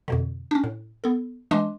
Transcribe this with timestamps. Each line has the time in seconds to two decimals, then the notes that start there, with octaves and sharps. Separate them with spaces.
0.08 F2 B2 D3
0.51 C#4 D4
0.64 A2
1.04 B3 A4
1.51 E3 G#3 D4 D#5 C6 D6